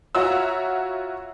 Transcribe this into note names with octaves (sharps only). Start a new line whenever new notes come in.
F4 F#4 C#5 E5 A#5 E6